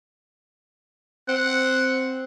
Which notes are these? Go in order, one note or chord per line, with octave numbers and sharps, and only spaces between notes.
C4 F#5